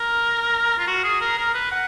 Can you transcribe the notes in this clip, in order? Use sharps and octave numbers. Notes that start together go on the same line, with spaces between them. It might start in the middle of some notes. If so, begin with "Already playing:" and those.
Already playing: A#4
F4
F#4
G#4
A#4
A#4
B4
F#5